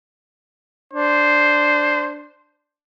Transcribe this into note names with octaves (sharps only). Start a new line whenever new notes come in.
D4 C5